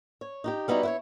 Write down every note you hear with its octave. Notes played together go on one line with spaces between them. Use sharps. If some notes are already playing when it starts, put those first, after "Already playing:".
C#5
D#4 F#4 G4
G3 B3 D#4 E4 F#4
E4 B4 C#5